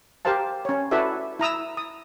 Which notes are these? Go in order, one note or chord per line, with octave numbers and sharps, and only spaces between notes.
G4 A#4 C5 F5 A5
C#4 C#5
E4 F#4 A4 B4 D5 E5
E4 A#5 D#6 E6
D#6